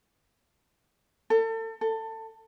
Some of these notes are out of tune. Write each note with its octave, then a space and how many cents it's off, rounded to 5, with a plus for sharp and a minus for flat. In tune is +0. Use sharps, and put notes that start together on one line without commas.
A4 +35
A4 +20